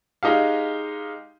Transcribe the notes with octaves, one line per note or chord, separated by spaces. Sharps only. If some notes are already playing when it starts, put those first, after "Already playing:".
G#3 D#4 G4 F5